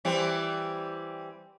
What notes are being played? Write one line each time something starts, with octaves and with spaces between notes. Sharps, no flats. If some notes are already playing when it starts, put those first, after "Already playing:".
E3 G3 C4